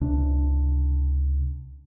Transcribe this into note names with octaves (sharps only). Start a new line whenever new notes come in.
C#2 C3 D4